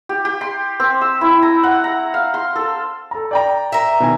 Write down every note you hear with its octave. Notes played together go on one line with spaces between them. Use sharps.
G4
G4
C6
C4
E6
E4
A#5
F#5
A#5
F5
C6
A4
A4 A#5
D5 G5 A#5
A#4 E5
B2 D#3 G#5